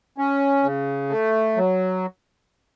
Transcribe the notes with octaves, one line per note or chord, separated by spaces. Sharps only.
C#4
C#3
A3
F#3